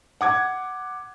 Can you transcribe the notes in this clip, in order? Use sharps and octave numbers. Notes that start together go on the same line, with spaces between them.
F#5 D6 G#6